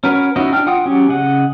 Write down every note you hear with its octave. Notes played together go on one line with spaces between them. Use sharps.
C#4 F#4 A#4 B4
C#4 D#4 E4 F#4 D#5
D4 G5 F6
F4 F#5 G5 D#6
F#3 C#4 G4
C#3 D#5 F#5